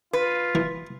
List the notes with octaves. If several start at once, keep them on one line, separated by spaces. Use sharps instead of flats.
F4 B4
E3